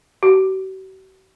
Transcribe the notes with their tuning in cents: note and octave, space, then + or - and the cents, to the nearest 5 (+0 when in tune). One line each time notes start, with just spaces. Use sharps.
F#4 +45